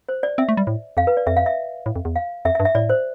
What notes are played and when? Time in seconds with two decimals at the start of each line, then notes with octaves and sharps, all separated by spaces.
0.09 C5
0.23 D5
0.38 C4 E5
0.49 A3
0.57 G3
0.67 A2
0.97 F2 F5
1.07 B4
1.17 D5
1.27 F2 E5
1.37 F5
1.46 E5
1.86 A2
1.96 F2
2.05 E2
2.16 F5
2.45 F2 E5
2.55 E5
2.60 G2
2.65 E5
2.75 A2 D5
2.89 C5